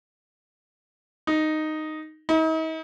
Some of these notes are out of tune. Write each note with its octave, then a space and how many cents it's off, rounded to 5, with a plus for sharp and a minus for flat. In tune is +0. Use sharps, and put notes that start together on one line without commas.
D#4 -5
D#4 +45